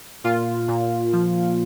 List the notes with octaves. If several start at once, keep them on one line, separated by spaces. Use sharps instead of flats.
A#2 F4
A#2
F3